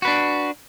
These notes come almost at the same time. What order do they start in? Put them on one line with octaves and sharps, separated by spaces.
F#4 B4 D4